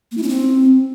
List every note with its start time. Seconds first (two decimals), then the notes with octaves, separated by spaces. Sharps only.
0.12 A#3
0.17 E4
0.23 C#4
0.29 C4